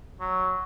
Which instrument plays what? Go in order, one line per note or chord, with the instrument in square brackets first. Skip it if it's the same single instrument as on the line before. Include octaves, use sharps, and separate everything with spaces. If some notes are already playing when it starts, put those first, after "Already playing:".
[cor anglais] F#3